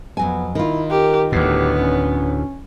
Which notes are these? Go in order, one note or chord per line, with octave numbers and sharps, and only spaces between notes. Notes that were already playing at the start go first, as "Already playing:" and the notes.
F2 F#3 B3 G#5
D#3 E4 F4
G4 A#4
D2 A2 B3 G4
C#4